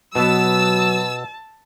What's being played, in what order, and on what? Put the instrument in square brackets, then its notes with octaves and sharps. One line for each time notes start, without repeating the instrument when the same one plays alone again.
[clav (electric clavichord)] B2 B3 [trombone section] F#3 [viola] A5 [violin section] E6